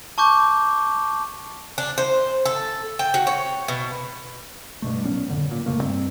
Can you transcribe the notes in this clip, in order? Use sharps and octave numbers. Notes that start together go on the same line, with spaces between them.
A5 C#6 D6 G6
D4
C5
A4
G5
F#4
C#5
B2
G2 B2 A3
A#2 F#3 B3 C#4
F1 A2 D3
A#2
F1 C#3 A3 A#3
G2 C4